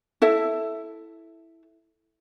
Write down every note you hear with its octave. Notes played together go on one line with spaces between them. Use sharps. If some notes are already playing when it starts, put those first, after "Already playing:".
E4 A4 E5